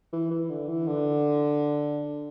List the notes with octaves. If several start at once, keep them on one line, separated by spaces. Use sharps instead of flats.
E3
E3
D3
E3
D3